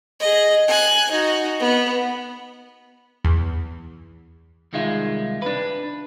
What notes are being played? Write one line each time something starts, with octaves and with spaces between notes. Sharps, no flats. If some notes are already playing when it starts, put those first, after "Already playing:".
G#4 D#5
G#5 F#6
D#4 F#4
B3
E2
C2 D#3 G#3 F4 E5
D4 B4